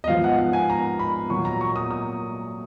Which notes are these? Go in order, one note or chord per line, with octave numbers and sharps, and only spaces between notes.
D#5
G#2 F3 B3 F5
F#5
F#5
G#5
A#5
B5
A#2 F#3 A#3 C#6
A#5
C#6
D#6
D#6